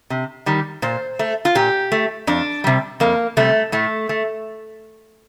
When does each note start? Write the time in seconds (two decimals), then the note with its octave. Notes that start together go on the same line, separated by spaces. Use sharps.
0.10 C3
0.46 D#3 G3
0.82 A#2 C5
1.19 A3
1.45 F4
1.55 A#2 G4
1.92 A3
2.27 F2 D4
2.64 C3 G3
3.00 F2 A#3
3.37 C3 G3 A3
3.72 A2 A3
4.09 A3